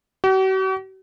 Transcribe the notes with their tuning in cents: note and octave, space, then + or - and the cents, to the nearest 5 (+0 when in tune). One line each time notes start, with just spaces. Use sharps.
F#4 +45